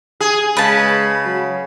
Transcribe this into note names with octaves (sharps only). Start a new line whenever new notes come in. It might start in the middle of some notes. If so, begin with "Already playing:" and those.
G#4
C#3 G#3 B4 A5
F#3